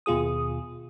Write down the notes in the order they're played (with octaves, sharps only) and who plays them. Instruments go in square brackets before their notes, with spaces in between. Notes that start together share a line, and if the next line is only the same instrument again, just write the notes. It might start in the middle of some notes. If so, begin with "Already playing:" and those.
[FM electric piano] D#2 B2 F4 G#4 D#6